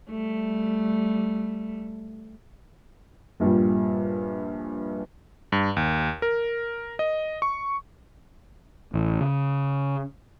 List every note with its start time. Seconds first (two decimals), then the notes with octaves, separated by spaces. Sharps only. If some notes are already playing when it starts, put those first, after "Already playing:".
0.11 G3 A3
3.40 A#1 G2 A#2 G3
5.52 G2
5.77 D#2
6.22 A#4
6.99 D#5
7.42 C#6
8.94 A1
9.21 C#3